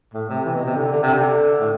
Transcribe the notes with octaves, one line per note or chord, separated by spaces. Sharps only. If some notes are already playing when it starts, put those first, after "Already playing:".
A2
C3
E3
B2
C3
D3
D3
C3
D3
A2